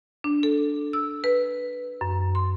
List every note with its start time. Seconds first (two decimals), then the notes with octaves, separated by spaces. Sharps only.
0.24 D4
0.43 A4
0.93 E6
1.24 B4
2.01 F#2
2.35 C6